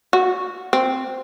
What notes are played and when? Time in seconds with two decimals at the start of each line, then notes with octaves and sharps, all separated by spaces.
0.13 F#4
0.73 C4